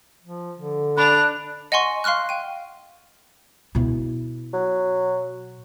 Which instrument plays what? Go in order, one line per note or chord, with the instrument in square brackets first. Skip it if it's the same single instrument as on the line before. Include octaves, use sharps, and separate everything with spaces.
[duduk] F3
D3
[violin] D4 F7 [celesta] B5 [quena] F#6
[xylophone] D#5 F#5 G#5 C6 C#6
F5 C6 C#6 F6 F#6
G5 D#7
[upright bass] B2 E4
[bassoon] F#3